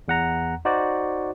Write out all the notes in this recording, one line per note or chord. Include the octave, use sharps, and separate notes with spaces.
E2 F#5 A#5
D#4 F#4 C5 D5